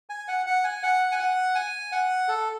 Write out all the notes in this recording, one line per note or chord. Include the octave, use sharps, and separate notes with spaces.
G#5
F#5
F#5
G#5
F#5
G#5
F#5
G#5
F#5
A4